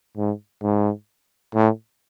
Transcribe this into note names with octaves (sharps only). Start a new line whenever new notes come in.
G#2
G#2
A2